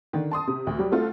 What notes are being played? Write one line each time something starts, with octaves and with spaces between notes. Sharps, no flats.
D3 D#3
A5 C6 D#6
C3
D2
F#3 G3 G4
A3 C4 F4 F#4 A4